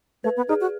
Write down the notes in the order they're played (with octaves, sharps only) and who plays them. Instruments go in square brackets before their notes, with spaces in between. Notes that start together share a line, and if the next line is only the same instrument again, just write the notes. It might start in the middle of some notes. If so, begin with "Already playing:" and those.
[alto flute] A3 [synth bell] B4
[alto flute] B3
[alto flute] D#4 [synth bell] G#4
[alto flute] F#4